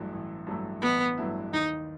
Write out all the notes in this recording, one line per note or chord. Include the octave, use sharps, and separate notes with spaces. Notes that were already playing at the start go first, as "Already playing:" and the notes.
Already playing: A1 G2 F#3 A3 E4
A1
G2 F#3 A3 E4
A1 B3
G2 F#3 A3 E4
D#2 D#4